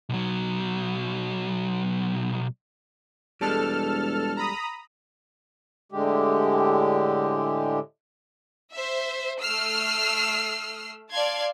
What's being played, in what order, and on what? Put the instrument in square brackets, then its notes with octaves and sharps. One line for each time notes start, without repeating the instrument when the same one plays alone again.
[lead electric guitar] B1 F#3
[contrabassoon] E1 [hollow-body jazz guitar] G3 G#3 [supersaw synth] A4 A5 F6
[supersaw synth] A#5 B5 D#6
[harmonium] A2 D3 G#3 G4
[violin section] C5 E5
A3 E6 F6 C7
D5 F5 A5 C6 G#6